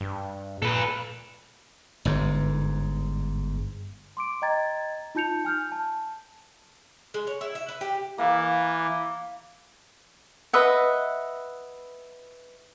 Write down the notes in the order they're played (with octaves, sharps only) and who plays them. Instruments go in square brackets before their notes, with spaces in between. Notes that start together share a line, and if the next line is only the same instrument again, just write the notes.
[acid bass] G2
[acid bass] A#2 [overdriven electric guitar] A4 B4
[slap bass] G1 G#2
[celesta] C6 D6 D7
D#5 G5 A#5 G#6 A6
D#4 F4 A5 G6 C#7 F7
G#5 F6 G6
A5
[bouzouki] G#3
C#5
E4
E5
B4
G4
[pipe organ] E3 [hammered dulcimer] A#3
[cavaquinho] B4 D#5 E5 F#5